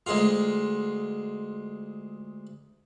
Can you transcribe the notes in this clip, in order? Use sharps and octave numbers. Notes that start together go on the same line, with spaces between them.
D2 G#3 F4